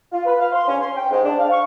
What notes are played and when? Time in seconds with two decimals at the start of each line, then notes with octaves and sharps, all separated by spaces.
0.12 F4
0.25 B4
0.39 F5
0.53 C6
0.67 C#4
0.81 C6
0.96 G5
1.11 G#2
1.24 D4
1.39 F5
1.51 C#6